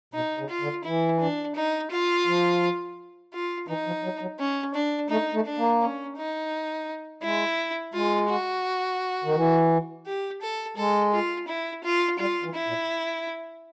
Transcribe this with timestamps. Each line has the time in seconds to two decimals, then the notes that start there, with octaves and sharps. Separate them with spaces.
0.14 B2 D#4
0.38 C#3
0.50 F4
0.61 D3
0.84 E3 E4
1.20 D4
1.56 D#4
1.91 F4
2.26 F3
3.33 F4
3.68 E3 D#4
3.86 F3
4.04 F#3
4.21 F#3
4.39 C#4
4.74 D4
5.10 A3 D#4
5.33 A3
5.45 D4
5.57 A#3
5.81 C#4
6.17 D#4
7.23 G#3 E4
7.94 G#3 F4
8.29 F#4
9.24 D#3
9.35 E3
10.06 G4
10.41 A4
10.77 G#3 A4
11.13 F4
11.48 E4
11.84 F4
12.19 G3 F4
12.43 E3
12.54 E4
12.66 A#2